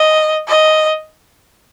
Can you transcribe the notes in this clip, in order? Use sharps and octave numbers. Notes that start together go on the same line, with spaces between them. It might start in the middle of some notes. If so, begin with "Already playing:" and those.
Already playing: D#5
D#5